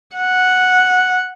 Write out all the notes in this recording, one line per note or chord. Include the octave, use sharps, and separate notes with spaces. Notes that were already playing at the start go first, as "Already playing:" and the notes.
F#5